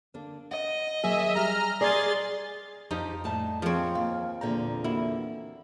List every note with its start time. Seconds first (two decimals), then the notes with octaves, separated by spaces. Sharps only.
0.14 D3 A#3 D4
0.51 D#5 F#5
1.04 D#2 F#3 A#3 G#4 E5
1.35 G3 G4 A#5 F6
1.81 G#4 D5 C6 A6
2.91 F2 F3 D#4 G4
3.24 A2 G3 A5
3.62 F3 C4 G#4 C#5
3.95 D#2 F5
4.41 E2 A#2 D3 A#5
4.84 A#3 E4 F#4